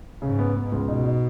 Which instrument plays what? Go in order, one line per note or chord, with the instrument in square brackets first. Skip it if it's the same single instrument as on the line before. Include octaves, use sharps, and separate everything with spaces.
[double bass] G#2 [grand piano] C#3
[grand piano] B3
B3
C#2
[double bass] B2 [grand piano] D#4
[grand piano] D#4